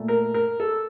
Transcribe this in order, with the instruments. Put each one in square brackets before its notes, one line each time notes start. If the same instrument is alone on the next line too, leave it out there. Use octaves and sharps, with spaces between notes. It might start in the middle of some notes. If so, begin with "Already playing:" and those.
Already playing: [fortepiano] A#2 A3
A#4
A#4
A4